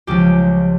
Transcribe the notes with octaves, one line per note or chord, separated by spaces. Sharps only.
C#2 C#3 F3 G4